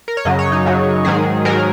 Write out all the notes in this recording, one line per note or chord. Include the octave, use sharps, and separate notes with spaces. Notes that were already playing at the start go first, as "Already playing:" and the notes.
A#4
C#5
F#2 C#3 F#3 D#5
C#5
D#4
F#2 C#3 F#3
G#2 D#3 F#3 G#4
G#2 D#3 F#3 A#4